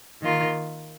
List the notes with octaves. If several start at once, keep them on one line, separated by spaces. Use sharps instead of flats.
D#3 A#3 F4